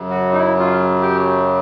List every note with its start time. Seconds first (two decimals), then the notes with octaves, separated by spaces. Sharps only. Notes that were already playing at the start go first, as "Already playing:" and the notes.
Already playing: F#2 C#3 F#3
0.10 F#4
0.33 D#4
0.38 E4
0.59 F4
1.02 G4